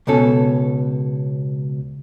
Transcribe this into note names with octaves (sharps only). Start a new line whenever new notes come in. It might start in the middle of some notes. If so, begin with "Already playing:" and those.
C#2 B2 C#4 A4